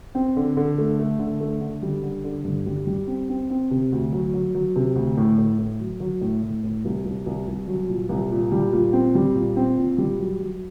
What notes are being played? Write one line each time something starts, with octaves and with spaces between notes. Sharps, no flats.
C4
D3
D3
A3
A3
D3
A3
D3
G3
D3
D3
G2
G3
G3
C4
C4
C4
C3
D2
F#3
F#3
F#3
C3
D2
A2
A2
A2
F#3
F#3
A2
A2
A2
C2
C2
C2
C2
F#3
A#2
C2
A#2
G3
A#2
C4
G3
A#2
C4
A#2
G3
F#3
F#3